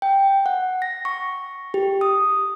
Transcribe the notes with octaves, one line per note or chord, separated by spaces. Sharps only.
G5
F#5
A#6
C#6
G4
D#6